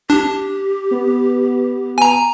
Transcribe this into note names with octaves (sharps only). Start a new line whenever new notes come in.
D4 G4
B3
G#5 A#5